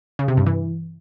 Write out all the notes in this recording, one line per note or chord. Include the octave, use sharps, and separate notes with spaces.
C#3
C3
G2
E3